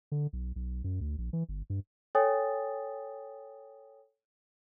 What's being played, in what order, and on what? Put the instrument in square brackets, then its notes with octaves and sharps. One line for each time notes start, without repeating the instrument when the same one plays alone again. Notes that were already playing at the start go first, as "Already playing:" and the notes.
[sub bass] D3
B1
B1
F#2
D2
A#1
E3
G1
G2
[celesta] A4 C#5 G5 G#5 D#6 A6